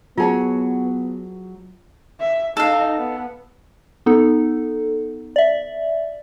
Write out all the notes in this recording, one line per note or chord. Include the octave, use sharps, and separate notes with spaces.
F#3 B3 F4 G#4 C#5 A5
E5
D#4 A4 F5
B3
B3 D#4 A4
D5 E5